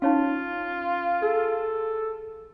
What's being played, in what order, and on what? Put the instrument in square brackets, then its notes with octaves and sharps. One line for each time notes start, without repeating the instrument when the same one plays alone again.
[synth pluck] C#4 [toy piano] D#4 C#5 F5 [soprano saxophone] F4
[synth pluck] G#4 [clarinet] A4